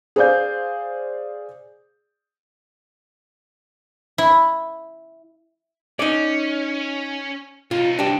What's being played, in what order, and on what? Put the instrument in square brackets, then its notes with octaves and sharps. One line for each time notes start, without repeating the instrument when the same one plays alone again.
[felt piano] G#4 C5 D5 F5 G6
[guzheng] E4
[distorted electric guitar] C#4 [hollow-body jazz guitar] D#4 D5
[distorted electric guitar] C2 D#4 [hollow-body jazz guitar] F4
[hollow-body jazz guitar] D4 G4